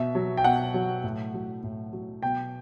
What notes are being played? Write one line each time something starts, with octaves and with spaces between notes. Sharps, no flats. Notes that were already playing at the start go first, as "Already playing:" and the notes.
Already playing: B2 E5
F#3
G5
B2 F#5
F#3
A2
F#3
A2
F#3
B2 G5